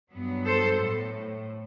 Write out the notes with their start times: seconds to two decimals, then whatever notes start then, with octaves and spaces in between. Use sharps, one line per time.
0.11 G2 F#3 B3
0.45 A4 C5
0.79 A2